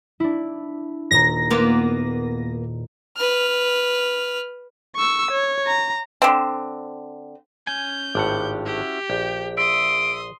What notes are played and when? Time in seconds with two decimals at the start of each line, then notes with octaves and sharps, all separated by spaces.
0.20 D4 E4
1.11 D#1 A#2 A#5 A#6
1.50 A#3 B3 F4
3.17 B4 F6
4.96 C#6 E6
5.31 C#5
5.67 A#5
6.22 D3 C4
7.67 C#4 G#5 G6
8.15 G#1 A2 D4 F4 G4 F#5
8.66 C#4 E4 F#4 G4
9.10 A#1 G5
9.57 E5 C6 D#6 D7